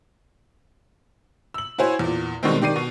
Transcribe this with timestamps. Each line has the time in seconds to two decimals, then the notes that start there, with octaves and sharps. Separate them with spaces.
1.54 E6 F#7
1.78 E4 F#4 C5 C#5 G#5
1.99 E2 A#2
2.43 B2 D#3 G3 G#3 C4
2.61 D#3 G4 D5 C7 D#7
2.76 B2